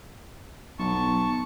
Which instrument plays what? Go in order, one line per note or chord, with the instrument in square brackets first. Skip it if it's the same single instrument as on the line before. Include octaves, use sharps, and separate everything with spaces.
[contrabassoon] B1 [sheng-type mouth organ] A5 C#6